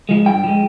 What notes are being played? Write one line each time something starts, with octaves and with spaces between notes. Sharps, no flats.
F3 G#3
G2 G5
F3 G#3